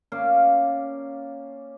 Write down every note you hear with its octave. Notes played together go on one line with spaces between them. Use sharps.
A#3 C#4 D5 F5